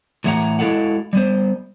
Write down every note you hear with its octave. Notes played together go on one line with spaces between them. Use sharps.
A2 E3 G#4 E5 F#5 A#5
G#3 E4 F#4 A4 F5 F#5
G3 B3 C5